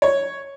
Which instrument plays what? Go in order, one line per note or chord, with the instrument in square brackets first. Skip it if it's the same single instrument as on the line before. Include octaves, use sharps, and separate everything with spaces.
[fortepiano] C#5